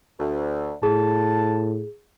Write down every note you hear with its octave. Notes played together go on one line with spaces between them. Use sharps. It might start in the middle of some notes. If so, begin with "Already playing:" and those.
D2
A2 G#4 A5